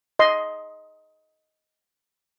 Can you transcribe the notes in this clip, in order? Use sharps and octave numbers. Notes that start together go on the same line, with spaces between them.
D#5 C6